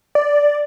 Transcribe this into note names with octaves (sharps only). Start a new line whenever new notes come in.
D5